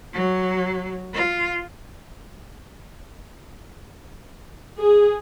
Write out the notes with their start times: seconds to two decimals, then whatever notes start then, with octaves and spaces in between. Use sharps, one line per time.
0.13 F#3
1.13 F4
4.79 G#4